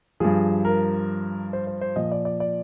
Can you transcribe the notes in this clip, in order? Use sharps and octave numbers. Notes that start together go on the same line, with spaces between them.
G2 F3 G#4
A#4
C5
C5
C5
A#2 F3 D#5
D5
D5
D5